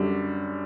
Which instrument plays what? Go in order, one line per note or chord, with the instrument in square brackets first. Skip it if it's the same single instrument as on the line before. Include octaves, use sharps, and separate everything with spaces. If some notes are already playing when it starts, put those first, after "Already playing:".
Already playing: [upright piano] F#2 D3 F#3 [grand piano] G3